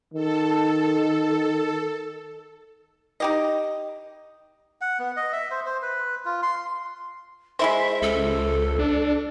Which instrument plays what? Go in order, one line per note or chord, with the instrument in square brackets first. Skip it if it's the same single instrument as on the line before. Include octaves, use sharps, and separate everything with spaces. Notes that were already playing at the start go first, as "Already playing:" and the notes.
[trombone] D#3 [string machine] A4
[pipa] D#4 G4 D#5
[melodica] F#5
B3
D#5
E5
C5
C5
B4
F4
C6
[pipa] G#3 E4 C5 [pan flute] E5
[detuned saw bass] C#2 [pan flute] A4
[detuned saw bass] D4